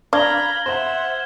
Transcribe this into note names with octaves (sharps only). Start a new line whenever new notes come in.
D4 F5 A#5 B5 F6 G#6 G7
C5 E5 F#5